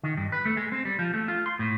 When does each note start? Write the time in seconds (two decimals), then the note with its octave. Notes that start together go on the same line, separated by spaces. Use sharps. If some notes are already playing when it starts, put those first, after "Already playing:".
0.03 D#3
0.17 G2
0.32 B4
0.45 A3
0.57 G#3
0.72 C4
0.85 G3
0.99 F3
1.14 A3
1.28 F4
1.46 C6
1.59 A2